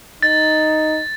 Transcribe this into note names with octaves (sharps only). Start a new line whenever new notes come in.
D#4 A6